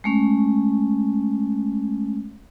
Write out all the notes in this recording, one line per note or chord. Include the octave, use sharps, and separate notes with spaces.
G#3 A3 C#4